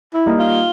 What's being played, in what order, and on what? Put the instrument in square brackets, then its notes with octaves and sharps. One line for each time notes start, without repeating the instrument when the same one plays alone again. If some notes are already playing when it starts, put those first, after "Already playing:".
[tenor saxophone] E4
[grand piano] G3 A#3 D#4
[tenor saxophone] F4